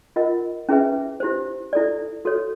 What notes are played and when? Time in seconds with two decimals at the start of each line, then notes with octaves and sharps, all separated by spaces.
0.16 F4 A#4 D#5 F#5
0.69 C#4 E4 G#4 B4 E5
1.20 E4 G4 C5
1.73 E4 A4 D5
2.25 F#4 A4 C#5